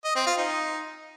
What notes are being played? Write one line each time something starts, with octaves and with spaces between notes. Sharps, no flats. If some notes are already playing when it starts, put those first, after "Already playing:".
D#5
C4
F4
D#4